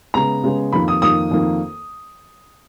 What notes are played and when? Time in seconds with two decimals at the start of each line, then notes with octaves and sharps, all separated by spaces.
0.14 C#3 G#3 B3 A#5
0.44 C#3 G#3 B3
0.73 F2 D#3 A#3 B5
0.88 D#6
1.02 F2 D#3 A#3 D#6
1.31 F2 D#3 A#3